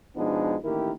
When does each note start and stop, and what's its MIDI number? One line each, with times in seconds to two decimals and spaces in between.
0.17 0.57 47
0.17 0.57 53
0.17 0.57 56
0.17 0.57 59
0.17 0.57 62
0.17 0.57 63
0.64 0.91 33
0.64 0.91 51
0.64 0.91 58
0.64 0.91 64
0.64 0.91 67
0.64 0.91 70